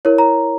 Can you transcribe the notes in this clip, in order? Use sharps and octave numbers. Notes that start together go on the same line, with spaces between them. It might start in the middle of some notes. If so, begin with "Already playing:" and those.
E4 A#4 C#5
A#5